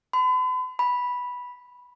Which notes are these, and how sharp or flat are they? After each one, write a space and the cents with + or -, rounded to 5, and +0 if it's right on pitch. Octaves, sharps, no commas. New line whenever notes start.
B5 +45
B5 -5